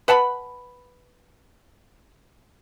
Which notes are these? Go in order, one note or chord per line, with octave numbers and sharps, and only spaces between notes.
B4 F#5 A5 B5